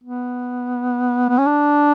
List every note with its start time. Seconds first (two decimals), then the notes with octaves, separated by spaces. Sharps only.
0.04 B3
1.29 B3
1.38 C#4
1.47 D4